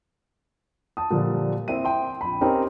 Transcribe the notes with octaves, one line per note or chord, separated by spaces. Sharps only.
A5 D#6
A#2 D3 F3 G3 D4
C4 E4 E5 D#7
G5 C6
A#1 B5
C4 C#4 D#4 G4 A#4